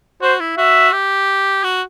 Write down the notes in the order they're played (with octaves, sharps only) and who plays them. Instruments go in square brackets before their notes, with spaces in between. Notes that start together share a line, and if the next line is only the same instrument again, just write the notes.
[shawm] F#4 [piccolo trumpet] C5
[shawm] E4
[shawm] F#4 [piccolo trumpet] E5
[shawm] G4
F#4